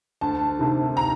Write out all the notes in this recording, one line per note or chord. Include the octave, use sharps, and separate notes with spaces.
D2 A5
C3 D#3
A#5